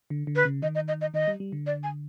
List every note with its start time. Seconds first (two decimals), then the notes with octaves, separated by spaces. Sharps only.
0.10 D3
0.27 D3
0.36 B4
0.45 C#3
0.62 D#3 D#5
0.75 D#5
0.88 D#5
1.01 D#5
1.14 D#3 D#5
1.28 G3
1.40 G3
1.52 D3
1.66 D5
1.83 G#5